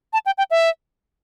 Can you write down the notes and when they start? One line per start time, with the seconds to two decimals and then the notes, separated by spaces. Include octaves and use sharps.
0.13 A5
0.26 G5
0.38 G5
0.51 E5